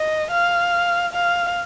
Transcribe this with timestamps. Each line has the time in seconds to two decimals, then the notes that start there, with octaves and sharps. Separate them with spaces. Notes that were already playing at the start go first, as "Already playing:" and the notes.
Already playing: D#5
0.31 F5
1.13 F5